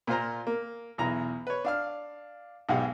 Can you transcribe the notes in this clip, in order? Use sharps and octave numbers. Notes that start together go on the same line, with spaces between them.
A#2 F4 C5 A#5
A#3
B1 E2 A#5
B4 C#5
D4 F5 F6
B1 G#2 G4 F5 F#5